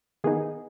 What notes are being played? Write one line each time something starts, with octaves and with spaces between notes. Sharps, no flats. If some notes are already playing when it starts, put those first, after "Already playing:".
D#3 B3 D#4 G#4